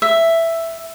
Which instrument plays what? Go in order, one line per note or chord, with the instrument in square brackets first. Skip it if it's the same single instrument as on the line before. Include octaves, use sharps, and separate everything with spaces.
[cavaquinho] E5